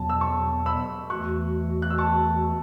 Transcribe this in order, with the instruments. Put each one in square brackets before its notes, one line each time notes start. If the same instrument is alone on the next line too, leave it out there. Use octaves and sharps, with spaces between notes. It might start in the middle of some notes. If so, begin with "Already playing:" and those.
Already playing: [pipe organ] E2 B2 F#3 B3 [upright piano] A5
[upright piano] E6
A5 C#6
B5 E6
[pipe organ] E2 E3 A3 F#4 [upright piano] C#6 F#6
[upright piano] F#6
E6
A5 C#6